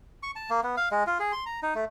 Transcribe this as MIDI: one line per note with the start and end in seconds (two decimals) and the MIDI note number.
0.23 0.31 85
0.36 0.50 81
0.50 0.61 58
0.63 0.76 59
0.77 0.89 77
0.91 1.04 56
1.07 1.18 65
1.20 1.32 68
1.32 1.45 84
1.46 1.60 82
1.62 1.74 63
1.75 1.85 57